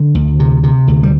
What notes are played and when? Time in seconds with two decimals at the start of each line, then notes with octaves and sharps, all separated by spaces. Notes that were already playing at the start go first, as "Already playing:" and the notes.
Already playing: D3
0.15 D2
0.40 C3
0.63 C3
0.87 D2
1.03 G3